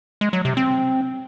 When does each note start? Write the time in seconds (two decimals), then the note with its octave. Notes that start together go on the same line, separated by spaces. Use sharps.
0.21 G#3
0.33 F#3
0.45 C3
0.57 C4